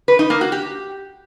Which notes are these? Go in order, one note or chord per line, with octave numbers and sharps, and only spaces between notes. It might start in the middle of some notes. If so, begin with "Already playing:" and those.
B4
D#4
A#3
F#4
G4